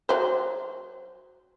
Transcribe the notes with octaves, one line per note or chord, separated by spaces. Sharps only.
F#3 C5